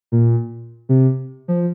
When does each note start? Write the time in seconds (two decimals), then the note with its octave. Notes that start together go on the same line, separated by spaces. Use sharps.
0.12 A#2
0.89 C3
1.48 F3